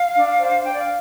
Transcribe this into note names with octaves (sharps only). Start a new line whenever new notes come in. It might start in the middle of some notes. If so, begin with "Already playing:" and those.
Already playing: F5
D4
C5
D4 G5
D5
F5